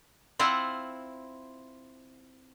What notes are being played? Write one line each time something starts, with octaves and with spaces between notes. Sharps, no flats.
C4 E4 F4 F#5